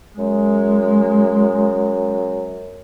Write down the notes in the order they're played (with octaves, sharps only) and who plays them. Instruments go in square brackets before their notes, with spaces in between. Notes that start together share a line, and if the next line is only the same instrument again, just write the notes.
[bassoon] F#2 [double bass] G#3